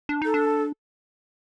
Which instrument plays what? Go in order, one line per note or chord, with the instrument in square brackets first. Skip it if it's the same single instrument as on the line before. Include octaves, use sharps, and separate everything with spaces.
[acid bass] D4
[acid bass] D#4 [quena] A4
[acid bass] D4